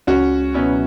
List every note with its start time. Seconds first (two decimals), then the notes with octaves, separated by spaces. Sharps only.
0.07 C#2 C#4 F#4
0.54 B2 F#3 B3 C#4 E4